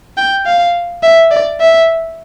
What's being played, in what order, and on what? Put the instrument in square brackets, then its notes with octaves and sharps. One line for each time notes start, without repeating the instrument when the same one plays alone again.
[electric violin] G5
F5
E5
D5
E5